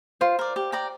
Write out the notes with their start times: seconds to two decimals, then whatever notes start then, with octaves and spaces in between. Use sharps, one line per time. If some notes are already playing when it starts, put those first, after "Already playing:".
0.21 F4 C5
0.39 A#4 D5
0.56 G4
0.72 D5 G5 A#5